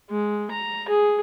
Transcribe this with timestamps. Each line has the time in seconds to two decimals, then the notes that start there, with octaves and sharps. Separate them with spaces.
0.10 G#3
0.51 A#5
0.88 G#4